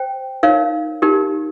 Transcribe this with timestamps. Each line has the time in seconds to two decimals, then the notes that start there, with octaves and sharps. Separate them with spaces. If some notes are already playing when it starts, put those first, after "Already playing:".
Already playing: C5 G5
0.43 D#4 A#4 C#5 F5
1.02 D#4 G4 A#4